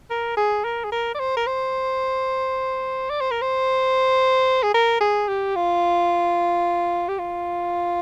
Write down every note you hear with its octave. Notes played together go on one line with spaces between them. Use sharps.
A#4
G#4
A#4
G#4
A#4
D5
C5
A#4
C5
D5
C5
A#4
C5
G#4
A#4
G#4
G4
F4
G4
F4